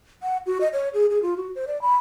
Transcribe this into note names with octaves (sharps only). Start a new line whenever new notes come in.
F#5
F#4
D#5
C#5
G#4
G#4
F4
F#4
C5
D5
B5